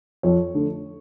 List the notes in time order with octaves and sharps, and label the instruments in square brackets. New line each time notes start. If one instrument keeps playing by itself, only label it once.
[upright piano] F2 C#5
D3 A3